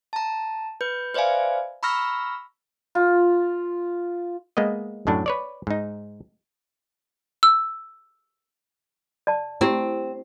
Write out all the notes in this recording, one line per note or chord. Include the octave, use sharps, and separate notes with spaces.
A5 A#5
B4 G6
B4 C5 D5 E5 F5 G#5
A#5 B5 C#6 E6 F6 A#6
F4
G#3 A#3 B3 D#5
F#2 A2 F#3 D4
B4 C#5 D5
G#2 D#4
E6
D5 A5
C4 E4 G4